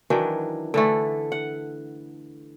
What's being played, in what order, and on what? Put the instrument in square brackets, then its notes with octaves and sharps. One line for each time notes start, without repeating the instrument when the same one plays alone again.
[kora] D#3 E3 F#3 D4
D3 E3 A3
F#5